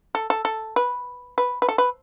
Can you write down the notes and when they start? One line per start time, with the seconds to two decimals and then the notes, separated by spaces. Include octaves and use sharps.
0.15 A4
0.30 A4
0.45 A4
0.76 B4
1.38 B4
1.62 B4
1.69 A4
1.78 B4